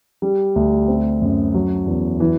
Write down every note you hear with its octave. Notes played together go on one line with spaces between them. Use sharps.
G3
D2
C4
F#2
F#3
E2
E3